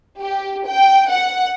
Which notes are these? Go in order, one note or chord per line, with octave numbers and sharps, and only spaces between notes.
G4
G5
F#5